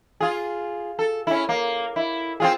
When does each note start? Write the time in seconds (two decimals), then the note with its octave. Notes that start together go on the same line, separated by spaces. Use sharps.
0.20 F4 G#4
0.99 A4
1.27 C#4 E4
1.49 A#3
1.96 E4
2.40 C4 F4 G#4